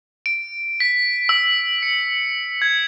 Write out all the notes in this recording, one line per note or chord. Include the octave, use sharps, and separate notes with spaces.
D7
B6
E6
C#7
G#6